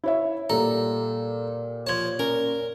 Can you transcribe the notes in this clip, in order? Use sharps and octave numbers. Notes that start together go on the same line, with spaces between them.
E4 C#5 E5
A#2 G3 A4 A#5
F3 C#5 A5 G#6
C#4 A#4